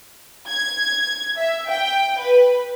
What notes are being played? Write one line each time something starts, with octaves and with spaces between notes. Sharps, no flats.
G#6
E5
G5
B4